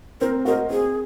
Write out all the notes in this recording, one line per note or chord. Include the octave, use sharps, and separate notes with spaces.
C4 A#4
F#4 A#4 C5 D#5
C4 G#4